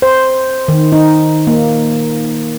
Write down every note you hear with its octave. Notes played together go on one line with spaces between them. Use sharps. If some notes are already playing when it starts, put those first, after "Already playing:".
C5
D#3
D#4
A#3